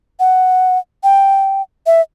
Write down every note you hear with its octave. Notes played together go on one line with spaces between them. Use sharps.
F#5
G5
E5